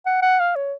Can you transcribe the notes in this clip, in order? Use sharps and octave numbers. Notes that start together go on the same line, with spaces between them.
F#5
F#5
F5
C#5